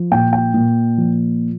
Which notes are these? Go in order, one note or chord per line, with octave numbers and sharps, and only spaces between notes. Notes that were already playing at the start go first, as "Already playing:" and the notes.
Already playing: F3
A#2 G5
G5
A#2
F3